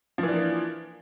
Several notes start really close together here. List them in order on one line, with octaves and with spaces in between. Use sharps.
F3 E3 D4 A#3